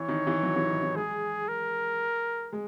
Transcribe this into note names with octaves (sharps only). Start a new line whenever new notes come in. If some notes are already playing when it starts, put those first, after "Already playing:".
Already playing: E3 C#5
D#3
E3
F#3
E3
D#3
E3
G#3 G#4
A#4
G#3